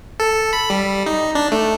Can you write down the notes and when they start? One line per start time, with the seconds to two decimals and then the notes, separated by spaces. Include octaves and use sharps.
0.20 A4
0.53 B5
0.70 G3
1.06 D#4
1.35 D4
1.52 A3